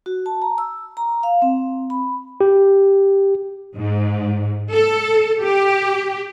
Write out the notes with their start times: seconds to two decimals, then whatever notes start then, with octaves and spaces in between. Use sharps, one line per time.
0.06 F#4
0.26 A5
0.42 A#5
0.58 E6
0.97 A#5
1.23 F5
1.42 C4
1.90 B5
2.41 G4
3.76 G#2
4.71 A4
5.40 G4